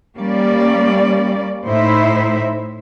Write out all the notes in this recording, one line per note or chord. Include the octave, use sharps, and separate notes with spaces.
G3 A#3 C#4 D5
A2 D#4 E4 C5 E5